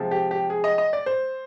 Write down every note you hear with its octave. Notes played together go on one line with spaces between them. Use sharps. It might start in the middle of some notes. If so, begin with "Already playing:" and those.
Already playing: C3 F3 G#3
G4
G4
G#4
D#5
D#5
D5
C5